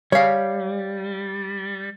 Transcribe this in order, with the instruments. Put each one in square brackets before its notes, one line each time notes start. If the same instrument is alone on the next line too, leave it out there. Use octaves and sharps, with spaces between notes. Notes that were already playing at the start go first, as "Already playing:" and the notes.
[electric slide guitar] G3 [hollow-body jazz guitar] C#5 F5